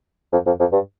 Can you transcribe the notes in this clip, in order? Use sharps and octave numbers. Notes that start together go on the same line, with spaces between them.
F2
F2
F2
G2